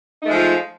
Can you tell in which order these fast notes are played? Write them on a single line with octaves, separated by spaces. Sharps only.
D#4 A3 G#3 F3 F4